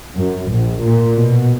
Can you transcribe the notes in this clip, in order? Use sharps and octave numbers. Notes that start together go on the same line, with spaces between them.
F#2
A#1
A#2
B2